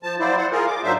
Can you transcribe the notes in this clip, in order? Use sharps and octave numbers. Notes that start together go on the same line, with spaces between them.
F3 A5
F#3 A#3 E4 C5 D5
C5 F#5
F4 G#4 A#4
D6
G#2 F#3 A#3 D4 C5 E5